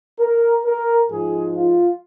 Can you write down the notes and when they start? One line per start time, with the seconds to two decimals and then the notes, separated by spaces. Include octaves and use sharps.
0.19 A#4
0.64 A#4
1.09 G#2 F3 G#3 G#4
1.55 F4